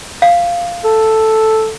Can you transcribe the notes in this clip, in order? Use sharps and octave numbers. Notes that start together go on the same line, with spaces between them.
F5
A4